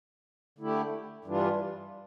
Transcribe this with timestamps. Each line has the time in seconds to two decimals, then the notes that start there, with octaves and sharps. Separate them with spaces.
0.58 D3 A3 E4 G4
1.25 G2 E3 G3 D4 F4